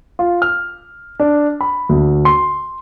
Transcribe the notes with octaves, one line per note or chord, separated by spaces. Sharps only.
F4
F6
D4
B5
D2
C6